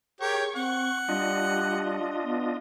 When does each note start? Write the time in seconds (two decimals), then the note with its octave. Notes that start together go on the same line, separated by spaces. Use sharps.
0.21 G4 G#4 A#4 C#5 C#6
0.55 C4 F#5
1.08 G3 D4 F4 D#5
2.24 B3